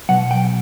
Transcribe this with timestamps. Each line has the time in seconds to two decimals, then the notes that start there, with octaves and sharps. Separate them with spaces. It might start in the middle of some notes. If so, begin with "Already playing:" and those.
0.09 B2 F#3 F#5
0.31 G5